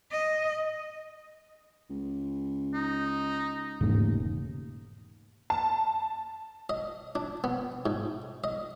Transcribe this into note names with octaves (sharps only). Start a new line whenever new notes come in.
D#5
C#2
D#4
E1 D#2 G#2 C#3 A3
A5
D#5
D4
B3
G#2
D#5